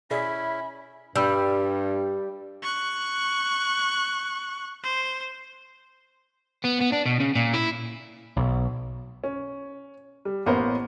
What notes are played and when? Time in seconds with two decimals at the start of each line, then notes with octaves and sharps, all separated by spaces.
0.11 B2 C#4 E4 G#4 D5 E5 B5
1.16 G2 G3 B5 E6
2.63 C#6 F#6
4.83 C5
6.65 B3
6.81 B3
6.93 D4
7.06 B2
7.20 C#3
7.35 A#2
7.54 E4
8.37 B1
9.24 C#4
10.25 G3
10.46 A1 A#3 B3 C#4 A#4 C5